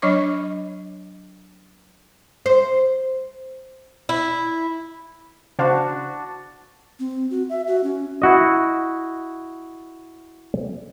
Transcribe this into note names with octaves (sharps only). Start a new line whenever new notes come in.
F#3 D4 C#5 D#5 C#6 D6
C5
E4
C#3 D4 F#4 C5 F5
C4
F#4
E5
F#4
C#4
E4 F#4 D#5